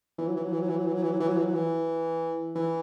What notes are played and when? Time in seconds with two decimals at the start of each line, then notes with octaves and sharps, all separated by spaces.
0.18 E3
0.28 F#3
0.36 E3
0.44 F#3
0.52 E3
0.61 F#3
0.69 E3
0.78 F#3
0.87 E3
0.94 F#3
1.03 E3
1.11 F#3
1.20 E3
1.28 F#3
1.37 E3
1.45 F#3
1.54 E3
2.55 E3